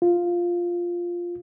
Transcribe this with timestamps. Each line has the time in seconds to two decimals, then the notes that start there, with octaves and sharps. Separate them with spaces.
0.02 F4